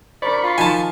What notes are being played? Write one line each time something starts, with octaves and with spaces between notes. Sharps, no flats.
D4 A#4 C5 D5 B5 C#6
F4
D#3 F3 D#4 G#5 A5